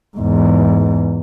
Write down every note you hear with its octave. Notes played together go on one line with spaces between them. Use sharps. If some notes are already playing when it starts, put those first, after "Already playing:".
E2 G#2